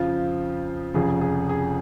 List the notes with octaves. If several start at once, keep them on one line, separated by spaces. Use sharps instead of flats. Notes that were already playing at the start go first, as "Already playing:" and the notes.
Already playing: F2 C#3 F3 F4
F1 F2 C#3 G#4
G#4
G#4